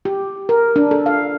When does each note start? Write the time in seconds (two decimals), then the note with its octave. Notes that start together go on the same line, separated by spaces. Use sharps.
0.05 G4
0.49 A#4
0.76 D4
0.91 A4
1.06 F5